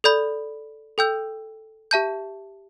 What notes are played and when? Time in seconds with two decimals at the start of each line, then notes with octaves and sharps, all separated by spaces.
0.04 A4 D5 B5 G6
0.98 A4 G5 E6 G6
1.91 G4 E5 A5 G6